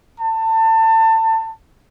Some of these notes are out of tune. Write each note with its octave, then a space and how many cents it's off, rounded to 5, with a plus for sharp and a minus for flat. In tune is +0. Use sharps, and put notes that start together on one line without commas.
A5 +25